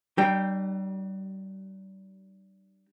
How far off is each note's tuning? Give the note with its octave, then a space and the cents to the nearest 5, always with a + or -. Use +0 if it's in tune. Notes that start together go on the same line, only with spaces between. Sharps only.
G3 -35 D4 +45 G5 +0